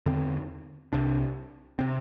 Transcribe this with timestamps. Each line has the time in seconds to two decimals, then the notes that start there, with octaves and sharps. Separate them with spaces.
0.06 E2 D3 C4
0.93 C2 C3 D4
1.79 C3 C4